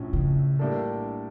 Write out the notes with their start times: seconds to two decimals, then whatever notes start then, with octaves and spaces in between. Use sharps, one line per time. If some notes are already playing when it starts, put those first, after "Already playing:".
Already playing: A#1 A2 F3 C#4 E4
0.13 C#3
0.59 A2 G3 A#3 D4 A4